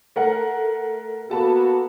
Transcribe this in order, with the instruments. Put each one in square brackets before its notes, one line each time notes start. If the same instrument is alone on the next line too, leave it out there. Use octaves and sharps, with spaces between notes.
[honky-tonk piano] A3 A#4 F#5
[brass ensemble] A#3 B3 F#4 [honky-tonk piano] A4 A5 B5